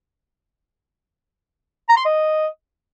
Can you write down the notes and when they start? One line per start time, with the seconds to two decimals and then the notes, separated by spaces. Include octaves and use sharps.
1.89 A#5
1.97 C6
2.05 D#5